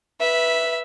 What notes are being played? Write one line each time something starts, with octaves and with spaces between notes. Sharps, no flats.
B4 E5